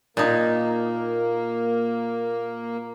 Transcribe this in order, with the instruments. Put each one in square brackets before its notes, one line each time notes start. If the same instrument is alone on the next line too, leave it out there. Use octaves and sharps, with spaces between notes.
[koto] A#2 D#4 [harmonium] A#3